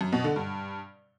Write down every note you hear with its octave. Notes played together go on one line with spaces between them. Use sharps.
F#2
B2
D3
G2